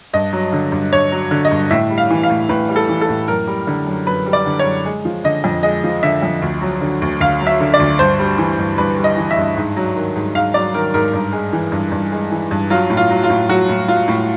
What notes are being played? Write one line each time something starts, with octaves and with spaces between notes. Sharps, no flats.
G2 D#5
F#3
D3
G2
G2 C#5
F#3
D3
D#5
G2
A2 E5
G3
F5
E3
F5
A2
A2 B4
G3
A4
E3
A4
A2
F#2 A#4
G3
D3
F#2
F#2 B4
G3
D5
D3
C#5
F#2
G#3
F3
D3 D#5
F2
G#3 D#5
F3
D3 E5
F2
D2
F#3
D3
D2
D2 F5
F#3
E5
D3
D5
D2
G2 C5
G3
E3
G2
G2 B4
G3
D#5
E3
E5
G2
G#2
F#3
D#3
G#2
G#2 F5
F#3 D5
D#3 A#4
G#2 A#4
G2
G#3
E3
G2
G2
G#3
E3
G2
F#3 F4
A2
F4
F#3
F4
A2
F#3 F#4
A2
F#3 F4
A2